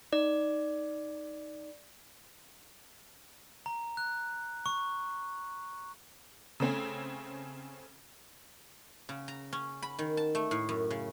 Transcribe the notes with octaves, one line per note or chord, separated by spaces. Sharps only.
D#4 D5
A#5
F#6
C#6
C#3 A3 C4 C#4
C#3
A#5
C#4
B5
D#3
A5
A3
A2
F#2
C#3